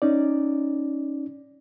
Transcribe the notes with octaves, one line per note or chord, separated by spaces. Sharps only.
C#4 D#4 D5